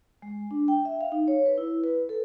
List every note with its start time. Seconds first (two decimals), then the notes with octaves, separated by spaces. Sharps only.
0.22 G#3
0.51 D4
0.68 G5
0.85 E5
1.01 F5
1.12 D#4
1.28 C#5
1.46 B4
1.58 E4
1.84 B4
2.09 A4